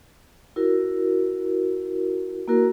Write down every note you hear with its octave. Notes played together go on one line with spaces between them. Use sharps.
E4 F#4 A#4
A#3 E4 F#4 A#4